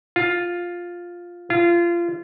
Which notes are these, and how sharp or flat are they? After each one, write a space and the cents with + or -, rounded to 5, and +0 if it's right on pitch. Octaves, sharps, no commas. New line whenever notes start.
F4 +5
F4 -25